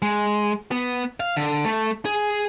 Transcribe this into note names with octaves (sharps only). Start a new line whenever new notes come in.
G#3
B3
F5
D3
A3
G#4